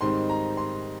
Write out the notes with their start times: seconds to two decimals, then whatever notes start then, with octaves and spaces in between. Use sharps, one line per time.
0.01 G#2 D#3 G3 C4 D#4 C6
0.30 A#5
0.57 C6